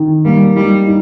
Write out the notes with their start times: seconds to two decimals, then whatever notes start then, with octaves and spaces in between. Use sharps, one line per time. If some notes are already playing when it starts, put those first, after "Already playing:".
Already playing: D#3
0.25 G3 A#3
0.56 G3 D#4
0.86 D#4